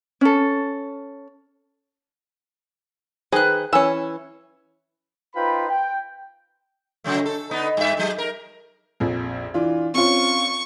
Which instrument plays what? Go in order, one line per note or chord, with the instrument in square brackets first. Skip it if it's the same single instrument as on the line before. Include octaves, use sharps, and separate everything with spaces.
[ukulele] C#4 A4
[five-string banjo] D#3 G#4 C5 [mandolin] B4 F#6
[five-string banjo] E3 C#4 [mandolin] E6
[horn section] D#4 F4 B4 C5 G5 B5
G5
[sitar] C#3 F#3 A3
A4
D3 B3 D#4
G2 E5
F#3 G#3
A#4
[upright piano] A#1 F2
E3 D4 F4
[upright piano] C4 C#4 F4 [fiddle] C#6